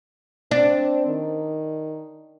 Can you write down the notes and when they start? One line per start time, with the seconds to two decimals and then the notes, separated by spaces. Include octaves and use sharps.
0.51 C4 D4
1.07 D#3